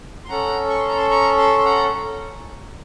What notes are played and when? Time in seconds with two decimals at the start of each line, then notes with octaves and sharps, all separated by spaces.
0.25 C6
0.29 C#4 A4 F#5 A#5
0.70 C#6
0.79 C6
0.88 A#5
0.97 A5 C6
1.10 A#5 C#6
1.38 A5 C6
1.59 C6
1.65 F#5 A#5